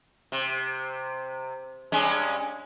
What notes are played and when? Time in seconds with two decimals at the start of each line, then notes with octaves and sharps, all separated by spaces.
0.32 C3
1.92 G2 G#3 C#4